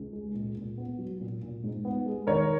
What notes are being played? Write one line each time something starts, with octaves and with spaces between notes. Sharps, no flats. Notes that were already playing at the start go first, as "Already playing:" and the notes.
Already playing: C#2
G#3
A#2
A#2
B3
F#3
A#2
A#2
G#2
B3
G#3
D#3 A#4 C#5